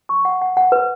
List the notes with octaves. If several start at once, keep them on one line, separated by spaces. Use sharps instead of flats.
C#6
F#5
F#5
F#5
B4